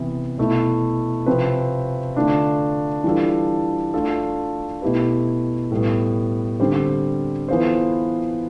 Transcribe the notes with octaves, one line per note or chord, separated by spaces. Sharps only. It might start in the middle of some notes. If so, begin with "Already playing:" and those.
Already playing: C3 E3 B3 E4
B2 A3 E4
C3 F3 C4 F4 B4
D3 A3 D4 F4
E3 G3 D4 F4 A4
A3 D4 F4 A4
B2 A3 E4 G4 B4
A2 G3 B3
D3 G3 C4 G4 C5
E3 B3 F4 A4 C5